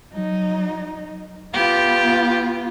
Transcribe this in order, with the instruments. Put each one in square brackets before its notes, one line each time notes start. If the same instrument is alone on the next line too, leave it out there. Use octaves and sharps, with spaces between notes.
[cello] F#3 D#4
[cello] B3 F4 [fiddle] G4